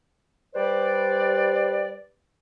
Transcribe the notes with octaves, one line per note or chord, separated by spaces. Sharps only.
G3 G4 B4 C5 D5